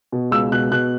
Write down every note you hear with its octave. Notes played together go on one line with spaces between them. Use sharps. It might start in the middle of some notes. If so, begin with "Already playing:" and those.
B2
C#2 E6
B2 F#6
B2 F#6